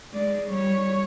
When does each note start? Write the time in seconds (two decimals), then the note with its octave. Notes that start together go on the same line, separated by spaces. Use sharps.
0.13 G#3 D5
0.49 G3 C#5